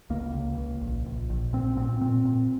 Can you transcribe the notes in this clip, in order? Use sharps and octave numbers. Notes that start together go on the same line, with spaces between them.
C#2 A#3
C#2
C#2
A#1
A#1
A#1
A#2 C4
A#2 C4
A#2 C4
A#2